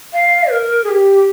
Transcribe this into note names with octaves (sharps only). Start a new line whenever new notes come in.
F5
A#4
G#4
G4